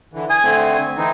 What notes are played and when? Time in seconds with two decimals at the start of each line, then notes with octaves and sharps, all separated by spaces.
0.13 D3 E3
0.30 G#5 D#6
0.44 D3 A3 C4
0.97 E3 C4 D#4